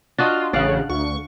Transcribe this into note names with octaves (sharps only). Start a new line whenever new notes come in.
D4 F4 F#4 D#5
A1 C#3 D5 F5 F#5
D2 C#6